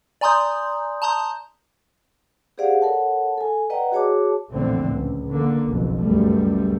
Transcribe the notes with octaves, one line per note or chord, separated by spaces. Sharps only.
D5 G#5 A#5 C6 D#6 G6
A5 A#5 C6 D#6 G6
G4 G#4 C5 D5 F5 F#5
A4 A#4 C#5 F#5 A5
A4 G#5
B4 D5 D#5 F#5 G5 A#5
F#4 G#4 C#5 A5 D6
A#1 E2 A2 D3 C4
C#2
D3 A#3
F#1 B1 F2
C#2 F#2 G3 A3